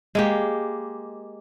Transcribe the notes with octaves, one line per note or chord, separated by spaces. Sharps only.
G#3 A#3 G4